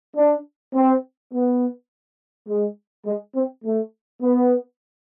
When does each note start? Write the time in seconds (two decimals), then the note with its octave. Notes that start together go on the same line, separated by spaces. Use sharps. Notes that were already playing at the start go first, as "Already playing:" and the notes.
0.15 D4
0.74 C4
1.32 B3
2.47 G#3
3.05 G#3
3.35 C4
3.63 A3
4.21 B3